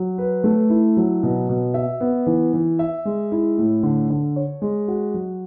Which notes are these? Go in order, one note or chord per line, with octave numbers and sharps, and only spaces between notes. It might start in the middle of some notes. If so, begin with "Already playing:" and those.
Already playing: F#3
B4
A3
E4
F#3
B2
B2
E5
B3
E3
E3
E5
G#3
E4
A2
D3
D3
C#5
G#3
F#4
F#3